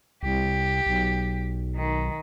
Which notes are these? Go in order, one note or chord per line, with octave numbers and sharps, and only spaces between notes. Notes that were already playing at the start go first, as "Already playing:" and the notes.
C2 G4
B1
D#3